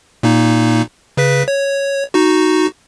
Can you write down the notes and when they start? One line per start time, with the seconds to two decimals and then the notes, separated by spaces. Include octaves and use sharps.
0.23 A#2 A#3 D#4
1.17 C#3 B4 B6
1.48 C#5
2.14 D#4 F#4